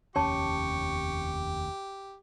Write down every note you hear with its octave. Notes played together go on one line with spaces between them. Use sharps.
F1 D#2 C#4 G4 C#5 A5 C#6